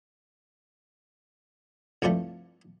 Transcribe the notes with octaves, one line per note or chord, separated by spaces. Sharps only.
C2 G2 C3 F3 G3 A3